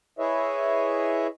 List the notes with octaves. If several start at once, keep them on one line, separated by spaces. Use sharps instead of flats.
E4 G#4 B4 C#5 D#5 E5